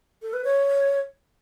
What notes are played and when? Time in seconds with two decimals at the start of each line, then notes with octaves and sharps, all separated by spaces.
0.22 A4
0.33 B4
0.44 C#5